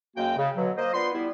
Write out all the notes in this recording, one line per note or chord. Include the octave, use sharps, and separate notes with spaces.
F#2 G#3 A#3 F#4 G5
C#3
B2 D3 F#3
A#3 C5 D#5
B3 D4 F4 C6
G3 B3 E4